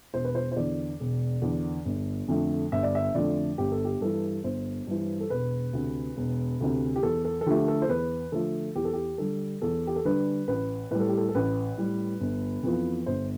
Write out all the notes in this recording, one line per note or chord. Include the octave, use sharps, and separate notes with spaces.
E1 C5
B4
C5
C5
E2 D3 D5
E1
E2 D3
G1
F2 D3 A3
G1 E5
D5
E5
F2 D3 A3 D5
G1 G4
A4
G4
G2 E3 A4
G1 C5
G2 E3
A4
E1 B4
D2 C3
E1
D2 C3
G4
E2 A4
A4
A4
D3 F3 A3 G4
A4
C5
E2 B4
D3 F3 A3 A4
E2 G4
A4
G4
D3 G3 D4 A4
E2 A4
G4
A4
D3 G3 D4 B4
A1 B4
A2 G3 B4
A4
G4
A4
A4
A1 B4
A2 G3
G1
F2 E3 B3 F4
G1 C5